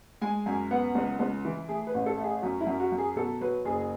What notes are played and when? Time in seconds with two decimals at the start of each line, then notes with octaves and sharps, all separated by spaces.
0.21 G#3 G#5
0.46 F#2 G#5
0.71 B3 F#5
0.95 C#2
1.19 C#2
1.45 E3
1.69 A3 G#4
1.87 B4
1.94 A1
2.06 A4
2.18 A3
2.24 G#4
2.42 F#2 F#4
2.61 E4
2.67 F#2
2.80 F#4
2.92 F#2
2.98 G#4
3.16 B2 A4
3.41 F#3 B4
3.65 F#1 G#4